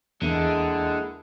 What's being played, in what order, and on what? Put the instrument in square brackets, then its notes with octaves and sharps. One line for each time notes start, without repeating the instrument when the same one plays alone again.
[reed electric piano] E2 [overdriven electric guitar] D3 [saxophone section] G#3 A#3 E4 [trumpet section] D#5 F#5 A5